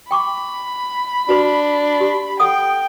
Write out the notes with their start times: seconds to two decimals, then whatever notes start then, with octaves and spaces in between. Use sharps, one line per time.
0.11 G5 B5 C#6 D6
1.29 D4 F#4 B4 C6
2.00 G4
2.40 A4 F#5 G5 D#6